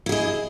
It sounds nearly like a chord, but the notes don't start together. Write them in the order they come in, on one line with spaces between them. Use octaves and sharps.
E4 G#4 D#5